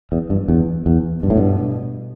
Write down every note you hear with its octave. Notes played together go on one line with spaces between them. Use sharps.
E2
G2
E2
E2
G2 B2
A2
G2